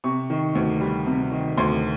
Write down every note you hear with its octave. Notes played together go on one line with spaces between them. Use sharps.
C3 C#6
D#3
D2
G3
C3
D#3
D2 C6